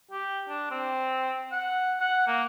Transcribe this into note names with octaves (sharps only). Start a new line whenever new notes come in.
G4
D4
C4
F#5
F#5
A#3